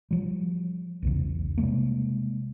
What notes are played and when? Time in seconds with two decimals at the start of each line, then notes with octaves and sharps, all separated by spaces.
0.11 F3 G3
1.02 B1 E2 C#3
1.58 C3 G3 G#3 A#3